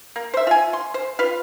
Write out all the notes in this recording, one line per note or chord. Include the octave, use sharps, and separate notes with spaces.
A#3
C5 E5
F4 G#5
C6
C5
F4 B4 F5